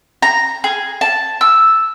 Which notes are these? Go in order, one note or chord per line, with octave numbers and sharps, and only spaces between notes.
A#5
G#4
A5
E6